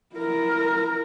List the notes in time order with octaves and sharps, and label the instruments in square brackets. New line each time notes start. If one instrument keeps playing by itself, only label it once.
[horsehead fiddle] E4 A#4